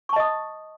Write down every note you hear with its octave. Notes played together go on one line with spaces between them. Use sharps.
D#5 A5 C#6 D#6